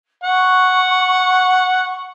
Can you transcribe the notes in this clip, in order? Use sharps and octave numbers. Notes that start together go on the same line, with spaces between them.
F#5 C#6